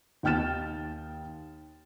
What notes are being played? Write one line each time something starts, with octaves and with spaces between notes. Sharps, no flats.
D#2 D#4 G5 F6 A6 E7